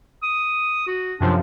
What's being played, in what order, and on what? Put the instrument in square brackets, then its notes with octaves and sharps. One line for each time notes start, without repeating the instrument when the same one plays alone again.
[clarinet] D#6
F#4
[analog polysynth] F#2 C3 F3 [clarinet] D4